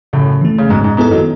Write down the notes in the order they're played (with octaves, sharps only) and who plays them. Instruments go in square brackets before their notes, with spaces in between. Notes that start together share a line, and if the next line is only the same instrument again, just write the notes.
[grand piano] F#2 A2 [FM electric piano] C#3
[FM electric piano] E3 A3
[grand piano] C#3
[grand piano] G#2 B2 [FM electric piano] G#3
[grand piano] G#2
[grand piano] G#2 [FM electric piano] B3 E4 A4
[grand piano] D#3 F#3